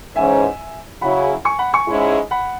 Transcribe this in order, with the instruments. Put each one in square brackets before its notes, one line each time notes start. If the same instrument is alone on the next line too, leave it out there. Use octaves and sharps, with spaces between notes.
[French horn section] G#2 E3 C#4 [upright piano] E5 G#5
[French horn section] C#3 F#3 E4 [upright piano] F#5 B5
[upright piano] G#5 C#6
F#5 B5
G#5 C#6
[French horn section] G#2 G#3 C#4 E4
[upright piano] F#5 B5